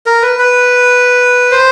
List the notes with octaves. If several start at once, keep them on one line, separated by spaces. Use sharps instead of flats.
A#4
B4
B4
C5